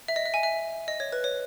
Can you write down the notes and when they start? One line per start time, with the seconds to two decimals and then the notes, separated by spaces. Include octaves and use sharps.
0.08 E5
0.16 D#5
0.25 E5
0.34 G#5
0.43 E5
0.88 D#5
1.00 C#5
1.12 B4
1.24 C#5